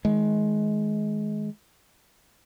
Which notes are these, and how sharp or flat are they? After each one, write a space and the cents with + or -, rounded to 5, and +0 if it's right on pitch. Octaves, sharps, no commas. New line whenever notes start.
D#3 +35 G#3 +25